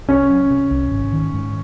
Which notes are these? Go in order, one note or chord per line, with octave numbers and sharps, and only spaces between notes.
C2 C#4
F#3
C3
C2
G#1
D#3
G#2